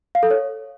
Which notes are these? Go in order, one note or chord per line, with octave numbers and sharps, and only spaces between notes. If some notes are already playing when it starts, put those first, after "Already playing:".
F5
A4
C#5